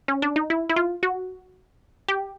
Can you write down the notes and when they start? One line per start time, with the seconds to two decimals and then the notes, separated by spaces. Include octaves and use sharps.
0.08 C#4
0.22 D4
0.36 D#4
0.50 E4
0.70 E4
0.76 F4
1.03 F#4
2.08 G4